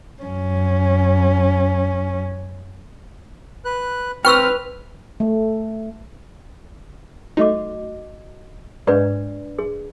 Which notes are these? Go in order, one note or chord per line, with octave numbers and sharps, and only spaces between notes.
F#2 C#4
B4 F#6
C4 B4 G5 C#6 E6 F6
A3
A3 D#4 F#4 D#5 D6
G#2 D4 B4 D5
G#4